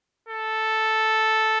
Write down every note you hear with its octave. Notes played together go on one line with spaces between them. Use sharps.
A4